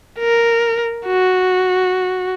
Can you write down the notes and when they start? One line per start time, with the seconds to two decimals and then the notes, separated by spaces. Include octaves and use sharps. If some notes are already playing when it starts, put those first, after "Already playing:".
0.19 A#4
1.07 F#4